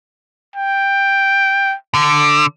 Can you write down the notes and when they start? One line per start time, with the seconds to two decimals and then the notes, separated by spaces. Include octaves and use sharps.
0.56 G5
1.94 D3